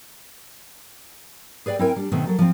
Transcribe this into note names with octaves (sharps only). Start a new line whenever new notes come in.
G#4 B4 D5 F5 G5
C4 E4 A#4 G5 G#5
G3 D4
B2 D#3 A3 B3 C4
F#3 A4 A#4
F3 C4